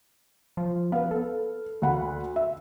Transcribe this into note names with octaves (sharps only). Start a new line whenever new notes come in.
F3
B3 B4 F5
A4
D2 F#5 B5
E5